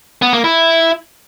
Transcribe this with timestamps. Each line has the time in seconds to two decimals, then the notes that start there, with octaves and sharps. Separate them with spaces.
0.22 B3
0.33 A#3
0.44 E4